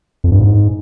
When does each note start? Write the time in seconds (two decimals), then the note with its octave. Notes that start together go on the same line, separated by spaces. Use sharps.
0.24 F2
0.32 G2
0.40 G#2